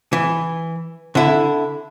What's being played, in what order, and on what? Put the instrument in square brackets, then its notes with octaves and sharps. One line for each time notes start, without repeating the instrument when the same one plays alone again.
[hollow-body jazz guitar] E3
D3 E4